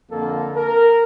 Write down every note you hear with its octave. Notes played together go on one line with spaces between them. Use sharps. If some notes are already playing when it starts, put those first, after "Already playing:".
F2 D3 A#3 A4
A#4